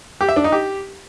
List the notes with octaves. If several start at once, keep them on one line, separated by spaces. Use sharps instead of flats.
G4
E5
D4
D#4
G4